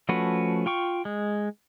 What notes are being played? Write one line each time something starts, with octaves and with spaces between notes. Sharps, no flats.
F3 A3 C#4 F#4 B4
F4 G5 C#6
G#3